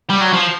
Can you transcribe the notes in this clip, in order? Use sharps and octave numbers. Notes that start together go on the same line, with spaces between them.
G3
F#3
F3